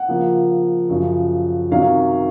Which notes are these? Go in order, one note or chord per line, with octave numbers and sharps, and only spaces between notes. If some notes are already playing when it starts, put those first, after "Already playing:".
Already playing: F#5
C#3 F3 A#3
F#2 C#3 F3
C3 D#3 F#3 C#4 F5